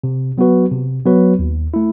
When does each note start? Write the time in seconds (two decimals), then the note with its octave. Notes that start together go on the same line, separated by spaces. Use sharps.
0.04 C3
0.38 F#3 B3 F#4 B4
0.72 C3
1.06 F#3 B3 F#4 B4
1.39 D#2
1.74 A3 E4